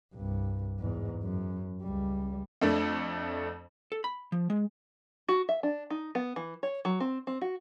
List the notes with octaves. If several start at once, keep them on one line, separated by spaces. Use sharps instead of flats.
C2 G2
E2 G#2
F#2
C#2 G3
F2 A3 D4
A4
B5
F3
G#3
F#4
E5
D4
D#4
B3
E3
C#5
F#3
C4
C4
F#4